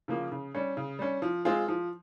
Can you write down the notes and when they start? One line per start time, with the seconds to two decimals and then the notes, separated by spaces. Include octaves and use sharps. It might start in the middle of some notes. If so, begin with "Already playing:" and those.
0.08 C#3 F3 A#3
0.32 C#3
0.55 G3 C#4
0.77 C#3
0.99 G3 C#4
1.22 F3
1.45 G#3 C4 F4 G#4
1.68 F3